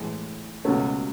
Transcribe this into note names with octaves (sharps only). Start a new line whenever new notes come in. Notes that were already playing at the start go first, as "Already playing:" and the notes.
Already playing: A2 E3 G#3
C#2 B2 F#3 A3 C#4